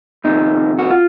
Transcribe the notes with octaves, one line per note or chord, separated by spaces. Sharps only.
F2 C3 D#3 D#4
F#4
F4